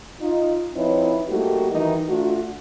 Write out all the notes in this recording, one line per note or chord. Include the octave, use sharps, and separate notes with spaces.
D#4 F4
F3 C4 D#4 E4 B4 C#5
G3 A3 A#3 D#4 F#4 G4
D#3 E3 D#4
A3 D4 F4 F#4